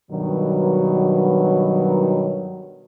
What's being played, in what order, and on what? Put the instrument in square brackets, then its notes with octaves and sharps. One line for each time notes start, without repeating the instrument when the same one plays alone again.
[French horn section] G2 B2 D#3 F#3